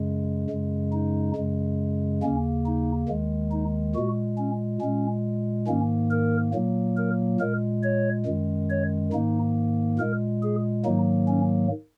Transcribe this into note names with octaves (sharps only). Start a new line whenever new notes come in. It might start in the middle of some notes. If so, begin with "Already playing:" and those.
Already playing: F#2 C#3 G#3
F#2 C#3 G#3
D#4
F#2 C#3 G#3
D#2 C#3 A#3 C#4
D#4
D#2 D#3 G#3
D#4
A#2 G#3 F#4
C#4
A#2 G#3 C#4
G#2 D#3 A#3 C#4
A#4
A#2 F#3 A#3
A#4
A#2 G#3 A#4
C#5
F#2 D#3 G#3
C#5
G#2 D#3 A#3 D#4
A#2 G#3 A#4
G#4
G#2 D#3 F#3 A#3 D#4
C#4